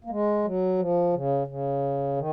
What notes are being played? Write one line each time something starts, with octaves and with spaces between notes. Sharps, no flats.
A#3
G#3
F#3
F3
C#3
C#3
D#3